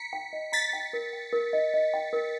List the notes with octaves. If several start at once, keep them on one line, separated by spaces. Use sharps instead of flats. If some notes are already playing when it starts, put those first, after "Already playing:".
Already playing: A#5 B6 C#7
G5
D#5
A#5 A6 B6
G5
A#4
G5
A#4
D#5
D#5
G5
A#4